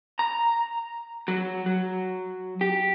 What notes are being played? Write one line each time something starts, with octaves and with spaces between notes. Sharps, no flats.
A#5
F#3
F#3
G4